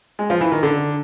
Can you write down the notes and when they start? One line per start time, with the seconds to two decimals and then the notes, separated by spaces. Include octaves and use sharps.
0.19 G#3
0.30 F3
0.41 E3
0.52 D#3
0.63 D3